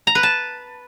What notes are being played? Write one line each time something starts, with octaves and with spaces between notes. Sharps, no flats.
A#5
B4
A5